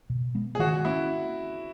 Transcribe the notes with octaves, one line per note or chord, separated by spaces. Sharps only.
B2
G#3 B3
G#4
D#3 F#4
A#3 C#4 E4